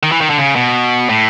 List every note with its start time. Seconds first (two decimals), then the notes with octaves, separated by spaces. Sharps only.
0.03 D#3
0.12 E3
0.21 D#3
0.30 D3
0.38 C#3
0.56 B2
1.10 A2